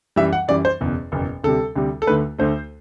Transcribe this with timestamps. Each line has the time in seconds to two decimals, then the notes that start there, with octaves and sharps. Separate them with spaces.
0.16 F#2 E3 G3 E5
0.33 F#5
0.48 F#2 E3 G3 D5
0.65 C5
0.81 F#1 E2 B2
1.12 F#1 E2 B2
1.44 D2 C3 G3 A4
1.76 D2 C3 G3
2.02 A4
2.07 D2 D3 A3 B4
2.39 D2 D3 A3 C5